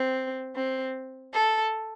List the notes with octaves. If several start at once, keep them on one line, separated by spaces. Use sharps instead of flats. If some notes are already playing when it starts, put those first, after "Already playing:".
Already playing: C4
C4
A4